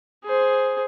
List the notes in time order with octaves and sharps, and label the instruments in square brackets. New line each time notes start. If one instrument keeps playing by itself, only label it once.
[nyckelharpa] G#4 C5